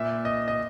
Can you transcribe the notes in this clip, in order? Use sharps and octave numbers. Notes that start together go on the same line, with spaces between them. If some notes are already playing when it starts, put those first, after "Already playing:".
Already playing: A#2 E5
D#5
D#5